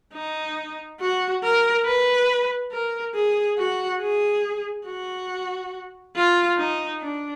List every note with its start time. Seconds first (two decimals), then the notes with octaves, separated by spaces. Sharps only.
0.14 D#4
1.00 F#4
1.43 A#4
1.85 B4
2.72 A#4
3.15 G#4
3.58 F#4
4.00 G#4
4.86 F#4
6.16 F4
6.58 D#4
7.01 D4